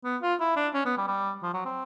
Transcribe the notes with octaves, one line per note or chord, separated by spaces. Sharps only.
B3
F4
E4
D4
C#4
B3
G3
G3
F3
F#3
C4